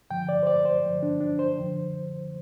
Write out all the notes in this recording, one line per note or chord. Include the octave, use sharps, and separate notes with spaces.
G2 D3 F3 G5
D5
C5
D5
C5
G2 D3 F3
D4
D4
C5
F2 D3 F3